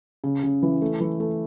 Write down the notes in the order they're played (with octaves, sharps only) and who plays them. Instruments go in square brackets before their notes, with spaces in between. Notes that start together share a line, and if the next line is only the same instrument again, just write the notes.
[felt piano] C#3
C#3
E3
A3
E3
A3